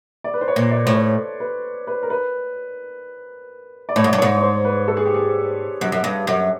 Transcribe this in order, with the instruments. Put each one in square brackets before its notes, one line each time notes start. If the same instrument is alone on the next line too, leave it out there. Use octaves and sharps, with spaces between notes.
[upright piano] D5
B4
C5
C#5
[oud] A#2
[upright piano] D5
[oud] A2 [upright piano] C5
[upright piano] C#5
B4
B4
A#4
B4
D5
[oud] A2 [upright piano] C#5
[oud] G#2
[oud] G2 [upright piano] D5
[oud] G#2 [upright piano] C#5
[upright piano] C#5
C5
B4
A4
G#4
G4
G#4
[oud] F#2
F#2
G2
F#2